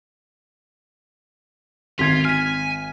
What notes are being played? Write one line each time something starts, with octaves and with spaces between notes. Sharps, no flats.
G#1 F4 G#6 B6 C7
G#5 F6 B6